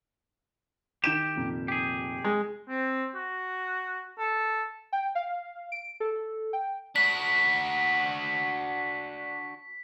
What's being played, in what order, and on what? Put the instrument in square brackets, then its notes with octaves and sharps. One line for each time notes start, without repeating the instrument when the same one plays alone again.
[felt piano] D#3 G6 E7 [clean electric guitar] G4
[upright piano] F1 A#2
[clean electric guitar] G4 G#4
[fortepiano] G#3
[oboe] C4
F#4
A4
[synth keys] G5
F5
D7
A4
G5
[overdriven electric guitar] D4 F#4 [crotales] B6